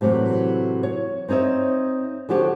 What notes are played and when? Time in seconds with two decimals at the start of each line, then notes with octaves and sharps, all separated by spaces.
0.01 A2 C3 E3 F#3
0.83 C#5
1.28 C4 D#4 C#5 D#5 E5
2.29 D3 F3 F#4 G4 C#5